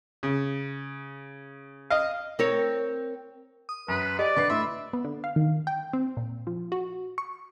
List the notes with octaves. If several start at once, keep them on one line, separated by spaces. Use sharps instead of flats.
C#3
D#5 F5
C4 A#4 C#5
D#6
F#2 B4
G4 D5 D#5
D3 B4 C#6 C7
A2 E5 B5 C6
B3
D3
F5
D#3
G5
C4
A#2
F3
F#4
C#6